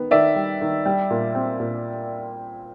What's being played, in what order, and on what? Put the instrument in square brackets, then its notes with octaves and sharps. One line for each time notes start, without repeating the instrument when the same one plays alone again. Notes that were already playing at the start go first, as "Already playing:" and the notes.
Already playing: [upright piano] D#3 B3
[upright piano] D#3 [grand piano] D5 E5
[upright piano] G3
D#3
G3
A#2
C4
A#2